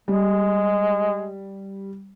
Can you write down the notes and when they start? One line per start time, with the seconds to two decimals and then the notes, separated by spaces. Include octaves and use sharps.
0.08 G3 G#3